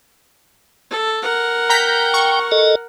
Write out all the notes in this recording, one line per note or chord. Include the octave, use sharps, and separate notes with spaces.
A4
A#4 F#5
G5 A#5 G6 B6
C#6
A4 D#5